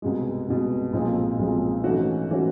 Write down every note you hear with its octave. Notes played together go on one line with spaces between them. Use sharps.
C2 B2 G#3
C2 B2 G#3
B1 A#2 F3 G#3 C4
B1 A#2 F3 G#3 C4
G#2 E3 A3 C#4 F#4
E3 A3 C#4 F#4